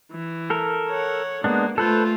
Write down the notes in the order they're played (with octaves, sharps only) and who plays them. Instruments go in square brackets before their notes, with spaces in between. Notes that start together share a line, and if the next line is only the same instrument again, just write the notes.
[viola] E3
[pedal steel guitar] A4 A#4
[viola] C#5 F#5
[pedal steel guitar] G#3 B3 D4 [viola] A#3
[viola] A3 F4 [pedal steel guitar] A4 B4 C5